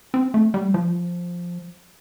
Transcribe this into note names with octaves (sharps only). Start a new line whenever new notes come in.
C4
A3
G3
F3